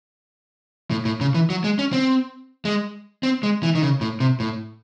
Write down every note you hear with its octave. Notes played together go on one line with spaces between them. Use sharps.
A2
A2
C#3
E3
F#3
G#3
C#4
C4
G#3
C4
G#3
E3
D#3
C#3
A2
C3
A2